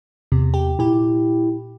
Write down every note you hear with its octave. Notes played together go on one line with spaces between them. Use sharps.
E2 C3
G4
A#2 E4 G4